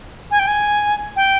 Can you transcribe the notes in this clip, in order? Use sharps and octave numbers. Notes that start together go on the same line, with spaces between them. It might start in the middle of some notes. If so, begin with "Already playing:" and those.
G#5
G5
G#5
G5